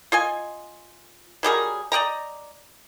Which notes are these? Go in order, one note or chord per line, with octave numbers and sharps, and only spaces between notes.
F4 D#5 G#5
F#3 G3 G#4 A#4
D5 D#5 G5 A#5